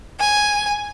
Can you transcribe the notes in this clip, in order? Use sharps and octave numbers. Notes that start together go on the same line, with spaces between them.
G#5